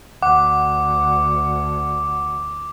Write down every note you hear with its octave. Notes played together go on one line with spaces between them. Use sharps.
D2 F#5 D6